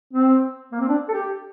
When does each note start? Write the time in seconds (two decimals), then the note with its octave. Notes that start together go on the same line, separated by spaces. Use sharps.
0.13 C4
0.72 A#3
0.80 C4
0.89 D4
1.08 A4
1.14 G4